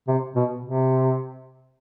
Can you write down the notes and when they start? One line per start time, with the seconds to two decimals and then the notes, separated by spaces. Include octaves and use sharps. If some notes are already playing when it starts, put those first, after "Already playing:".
0.08 C3
0.36 B2
0.65 C3